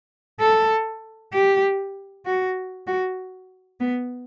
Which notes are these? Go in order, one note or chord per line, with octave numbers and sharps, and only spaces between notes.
A4
G4
F#4
F#4
B3